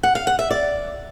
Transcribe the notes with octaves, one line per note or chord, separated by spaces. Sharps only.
F#5
F5
F#5
E5
D5